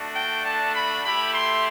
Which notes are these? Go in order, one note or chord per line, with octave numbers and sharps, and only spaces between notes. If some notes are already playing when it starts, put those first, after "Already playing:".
Already playing: A3 D4 F#4
G5
A5
B5
A3 E4 G4 B5
C6